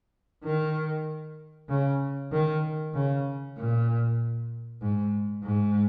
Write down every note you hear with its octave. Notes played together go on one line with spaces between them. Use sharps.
D#3
C#3
D#3
C#3
A#2
G#2
G#2